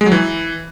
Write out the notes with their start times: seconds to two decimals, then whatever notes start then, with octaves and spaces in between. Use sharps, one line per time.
0.01 G#3
0.06 F#3
0.12 E3